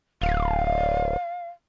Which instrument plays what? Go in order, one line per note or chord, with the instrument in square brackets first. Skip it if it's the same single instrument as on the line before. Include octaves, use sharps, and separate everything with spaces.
[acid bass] D1 [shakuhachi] F5